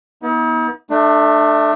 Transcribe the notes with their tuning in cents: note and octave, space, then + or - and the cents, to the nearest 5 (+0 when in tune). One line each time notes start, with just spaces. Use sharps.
B3 -30 D#4 +45
A3 +0 D4 +25